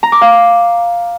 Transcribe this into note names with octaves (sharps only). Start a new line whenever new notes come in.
A#5
D6
F5